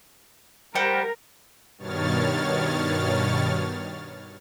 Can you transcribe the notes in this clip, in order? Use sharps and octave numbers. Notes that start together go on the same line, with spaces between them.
G3 A#4 C5 F#5 G5
G2 B2 D#3 C#5 F6 A6